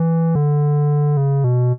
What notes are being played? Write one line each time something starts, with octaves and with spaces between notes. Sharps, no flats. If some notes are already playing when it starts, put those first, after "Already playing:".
Already playing: E3
D3
C#3
B2